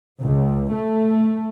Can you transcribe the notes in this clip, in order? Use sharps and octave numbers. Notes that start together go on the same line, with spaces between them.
C#2
A3